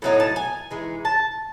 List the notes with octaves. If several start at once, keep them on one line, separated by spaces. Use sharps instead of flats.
A2 F#3 B3 D#4
A5
G#5
E3 G#3 D#4
A5